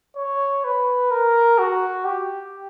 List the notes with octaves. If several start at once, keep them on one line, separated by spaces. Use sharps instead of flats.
C#5
B4
A#4
F#4
G4